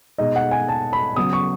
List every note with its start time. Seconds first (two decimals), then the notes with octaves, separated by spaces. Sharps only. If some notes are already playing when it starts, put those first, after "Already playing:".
0.18 B2 G#3 D#4 D#5
0.36 F#5
0.51 G#5
0.68 A5
0.93 B5
1.16 C#3 F#3 B3 D#6
1.33 C#6